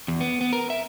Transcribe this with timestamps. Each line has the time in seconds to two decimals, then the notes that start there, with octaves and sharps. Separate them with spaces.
0.08 E2
0.21 B3
0.41 B3
0.53 A#4
0.70 E5